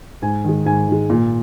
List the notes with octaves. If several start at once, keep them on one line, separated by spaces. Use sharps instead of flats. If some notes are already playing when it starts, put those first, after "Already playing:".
G#2 G#5
D#3 G#3
G#2 G#5
D#3 G#3
A#2